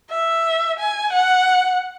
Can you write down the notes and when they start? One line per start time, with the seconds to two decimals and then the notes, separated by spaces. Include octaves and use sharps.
0.10 E5
0.79 G#5
1.13 F#5